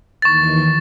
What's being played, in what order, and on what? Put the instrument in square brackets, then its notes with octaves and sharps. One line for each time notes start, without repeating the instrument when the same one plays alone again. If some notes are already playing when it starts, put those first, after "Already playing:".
[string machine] D#2 D#3 E3 [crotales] C#6 A6